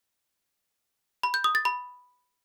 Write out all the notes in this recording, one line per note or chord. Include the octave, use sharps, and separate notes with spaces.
B5
G6
D#6
A6
B5